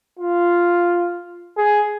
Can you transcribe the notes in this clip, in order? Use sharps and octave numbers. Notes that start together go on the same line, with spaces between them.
F4
G#4